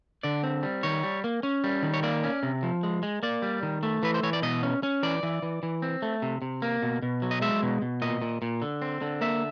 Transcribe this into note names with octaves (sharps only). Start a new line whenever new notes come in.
D3 D5
C4
G3
D#3 C#5
G3
A#3
C#4
G3
D#3
C#5
A#3 D5
C#4
C3
F3
G#3
G#3
A#3 D5
G3
D#3
A3
E3 B4
C5
E3 C#5
D5
B2 D#5
C#4
C#4
E3 D5
E3
E3
E3
C4
A3
C3
C3
A#3
B2
B2
F#3
D#5
G#3 E5
B2
B2
A#2 D#5
A#2
A#2
D3
C4
D3
A#3 E5